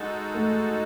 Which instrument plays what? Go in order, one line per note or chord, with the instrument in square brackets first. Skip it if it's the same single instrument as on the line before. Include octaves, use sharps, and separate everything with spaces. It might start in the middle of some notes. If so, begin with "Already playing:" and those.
Already playing: [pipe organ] G#3 D#4 F#4 A4
[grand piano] A3